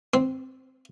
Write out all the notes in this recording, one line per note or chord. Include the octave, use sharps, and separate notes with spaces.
C4